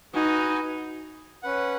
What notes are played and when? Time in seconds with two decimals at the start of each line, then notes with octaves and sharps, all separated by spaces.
0.14 D#4 F#4 B4 G#5
1.43 C#4 B4 F#5